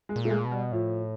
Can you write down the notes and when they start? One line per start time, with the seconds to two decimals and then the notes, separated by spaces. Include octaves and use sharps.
0.09 G#3
0.16 A#2
0.25 A3
0.30 G#3
0.45 B2
0.51 G3
0.72 A2 F3